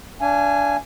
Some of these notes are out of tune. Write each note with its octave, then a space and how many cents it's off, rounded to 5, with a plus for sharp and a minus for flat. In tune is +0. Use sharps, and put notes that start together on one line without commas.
D4 -20 F5 -40 G#5 +0